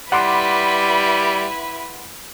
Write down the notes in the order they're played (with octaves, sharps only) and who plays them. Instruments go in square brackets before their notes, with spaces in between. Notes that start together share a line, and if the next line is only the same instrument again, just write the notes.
[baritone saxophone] G3 [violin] E4 B4 [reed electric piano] F#5 C6 D6